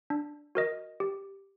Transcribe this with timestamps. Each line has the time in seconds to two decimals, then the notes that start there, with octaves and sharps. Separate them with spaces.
0.10 D4
0.55 F#4 A#4 D#5
1.00 G4